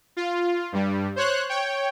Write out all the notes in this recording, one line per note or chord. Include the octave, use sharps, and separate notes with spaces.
F4
G2 G3
C5 C#5 F#6
C#5 G5